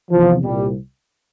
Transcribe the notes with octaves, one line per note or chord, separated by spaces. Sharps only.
E2 C3 E3 F3
C2 A#2 G3